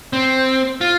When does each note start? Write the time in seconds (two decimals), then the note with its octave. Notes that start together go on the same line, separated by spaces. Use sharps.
0.13 C4
0.81 F4